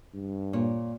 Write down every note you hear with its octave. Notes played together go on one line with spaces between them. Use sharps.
G2
A#2 C#5